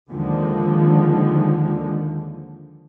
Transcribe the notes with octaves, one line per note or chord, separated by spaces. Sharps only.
D#2 D3 D#3 F3 G#3